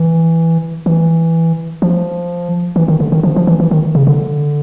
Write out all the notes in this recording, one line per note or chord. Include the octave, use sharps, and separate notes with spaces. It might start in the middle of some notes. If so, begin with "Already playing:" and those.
Already playing: E3
E3
F3
E3
D#3
D3
D#3
F3
F3
E3
E3
D#3
C#3
D3